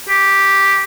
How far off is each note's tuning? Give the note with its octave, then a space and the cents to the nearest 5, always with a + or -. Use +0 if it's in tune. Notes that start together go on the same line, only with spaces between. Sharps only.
G4 +0